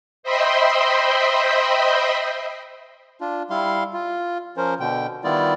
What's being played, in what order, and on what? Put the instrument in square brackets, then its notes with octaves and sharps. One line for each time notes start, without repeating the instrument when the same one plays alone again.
[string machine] C5 D#5 E5 G5 B5 C6
[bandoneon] D4 F4
G3 E4 F5 C6
F4
F3 C#4 A#4 C5
B2 D3 G5
D#3 G3 B3 E4 F4 D5